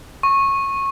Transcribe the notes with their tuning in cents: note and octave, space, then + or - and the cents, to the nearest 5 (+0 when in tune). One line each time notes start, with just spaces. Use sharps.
C#6 -20